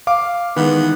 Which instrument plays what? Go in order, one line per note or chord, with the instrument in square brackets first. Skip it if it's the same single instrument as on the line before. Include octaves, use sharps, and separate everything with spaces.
[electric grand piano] F5 D6
[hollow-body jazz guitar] D#3 [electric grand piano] E3 G#3 [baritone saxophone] B3